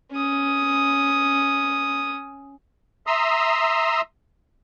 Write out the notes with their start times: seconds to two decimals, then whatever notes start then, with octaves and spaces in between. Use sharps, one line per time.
0.12 C#4 D#6
3.07 E5 A#5 C6 D#6 E6